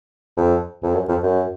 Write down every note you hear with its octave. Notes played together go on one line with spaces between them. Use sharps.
F2
F2
F#2
F2
F#2